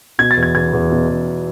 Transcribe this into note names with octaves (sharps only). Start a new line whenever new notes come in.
B2 G#6
A6
E2
G#6
E2 G#6
E2
B2
E2